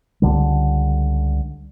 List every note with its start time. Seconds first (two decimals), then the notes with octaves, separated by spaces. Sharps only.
0.22 C#2 D3 G3